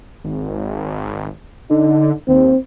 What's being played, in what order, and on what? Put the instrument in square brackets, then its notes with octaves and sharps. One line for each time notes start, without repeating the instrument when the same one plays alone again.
[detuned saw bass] G#1
[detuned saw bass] D3 [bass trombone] D#4
[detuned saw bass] D#2 [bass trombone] C4